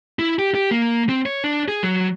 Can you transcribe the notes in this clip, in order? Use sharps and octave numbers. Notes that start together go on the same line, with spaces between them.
E4
G4
G4
A#3
C4
C#5
D4
G#4
F#3